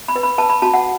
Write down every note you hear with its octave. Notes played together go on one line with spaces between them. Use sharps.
B5
B4
B5
B4 A5
B5
F#4 A5
F#5